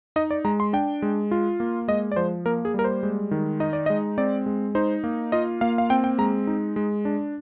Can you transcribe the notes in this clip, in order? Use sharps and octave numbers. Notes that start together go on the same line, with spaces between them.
D#4 D#5
D5
G#3 A#5
C6
D4 G5
G#3
F4
A#3
G#3 D#5
D5
F3 C5
A#3 A#4
G#4
G3 A#4
C5
G#3
D#3
D#4 D#5
D5
G#3 D#5
C4 D5
G#3
D#4 C5
A#3
F4 D#5
A#3 F5
F5
C4 G5
G5
G#3 A#5
D#4
G#3
D4